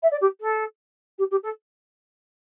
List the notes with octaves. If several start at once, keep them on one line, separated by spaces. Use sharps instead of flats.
E5
D5
G4
A4
G4
G4
A4